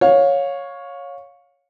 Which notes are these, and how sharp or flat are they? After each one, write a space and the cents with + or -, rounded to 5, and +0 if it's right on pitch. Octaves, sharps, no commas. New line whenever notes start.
C#5 +0 F5 +25